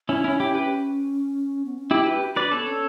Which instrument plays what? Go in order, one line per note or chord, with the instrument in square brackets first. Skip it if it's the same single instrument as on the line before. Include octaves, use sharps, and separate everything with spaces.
[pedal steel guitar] C#4 E4 [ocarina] D4
[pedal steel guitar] C#4 E4 [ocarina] D4
[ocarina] C#4 [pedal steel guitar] E4 G4
[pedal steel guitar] G4 B4
[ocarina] B3
C#4
[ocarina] D4 [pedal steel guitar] E4 G4
[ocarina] F#4 [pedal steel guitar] G4 B4
[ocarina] F#4
[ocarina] D4 [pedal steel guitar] B4 D5
[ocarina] B3 [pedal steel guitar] A4 C#5
[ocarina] C#4